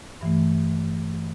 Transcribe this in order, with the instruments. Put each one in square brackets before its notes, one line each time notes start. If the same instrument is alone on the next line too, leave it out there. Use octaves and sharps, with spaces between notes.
[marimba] G2 E3 A3